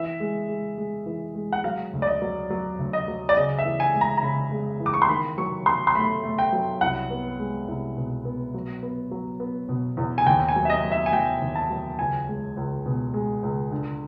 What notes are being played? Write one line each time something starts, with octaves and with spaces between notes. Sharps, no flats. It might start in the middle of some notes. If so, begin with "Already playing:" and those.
Already playing: E3 E5
G#3
G#3
G#3
E3
G#3
F#5
F#3 F5
D2
D5
D#5
F#3
F#3
D2
D#5
F#3
D5
C#3 D#5
E5
E3
G#5
G#3
A#5
A#5
C#3 B5
G#3
E3
D6
C#6
C6
D#3 B5
F#3 C#6
F#3 C6
C6
A3 B5
A3
G5
F#3
C2 F#5
B3
G#3
C2
B2
B3
F#3
B3
F#3
B3
B2
E2
G#5
D#2 G5
G#5
F#3
E5
D#5
F#3
E5
G#5
F#3 G5
D#2
A5
F#3
C#2 G#5
G#3
C#2
B2
G#3
C#2
D3